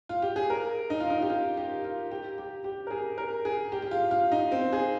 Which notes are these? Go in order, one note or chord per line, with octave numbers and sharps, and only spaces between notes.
F4
G4
G#4
A#4
D#4
F4
D#4
G4
F4
G4
F4
G4
G4
G4
A#4
G#4
A#4
G#4
G4
G4
F4
F4
D#4
C4
G#4